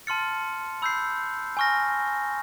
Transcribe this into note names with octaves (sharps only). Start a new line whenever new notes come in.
A5 C6 F6 A6 C#7
B5 E6 G6 C7
G#5 C#6 F6 A#6